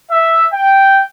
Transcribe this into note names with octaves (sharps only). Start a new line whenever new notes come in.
E5
G5